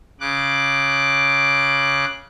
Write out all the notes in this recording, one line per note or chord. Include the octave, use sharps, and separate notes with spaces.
C#3 D6 F#6